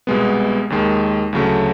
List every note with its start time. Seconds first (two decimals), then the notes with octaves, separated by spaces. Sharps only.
0.07 C2 B2 G#3 B3
0.70 D#2 D#3 G#3
1.33 D2 C#3 F#3 A3